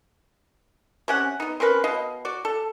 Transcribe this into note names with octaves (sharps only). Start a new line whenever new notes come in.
C3 C#4 F#5
B3 D#4
C4 C#4 A#4 B4
B2 D#5 F5
F#4 D5
A4